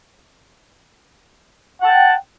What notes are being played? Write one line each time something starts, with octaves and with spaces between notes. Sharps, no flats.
F#5 G5 A5